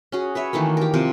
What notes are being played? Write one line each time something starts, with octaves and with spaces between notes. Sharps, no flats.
C#4 F#4 G#4
B4 C#5 E5
D#3 E3 A3 A#3
G4 A#4
C3 F3 C4